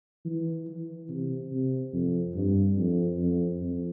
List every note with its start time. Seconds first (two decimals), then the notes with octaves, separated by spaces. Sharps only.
0.25 E3
0.67 E3
1.09 C3
1.51 C3
1.93 F2
2.35 G2
2.77 F2
3.18 F2
3.60 F2